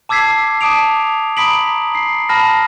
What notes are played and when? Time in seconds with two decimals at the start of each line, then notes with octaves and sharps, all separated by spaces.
0.09 A5 D6 E6 G#6 B6 C7
0.31 E6
0.61 A5 D6 D#6 D7 F7
1.37 A#5 B5 D#6 B6 D7 F#7
1.95 C7
2.29 A5 B5 F6 A#6